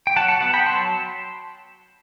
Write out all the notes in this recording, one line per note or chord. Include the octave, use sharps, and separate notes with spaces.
G5
F#3 F#5 A5
F#5 A5
B3 F#5 A5
G5 B5
F#3 A5 C6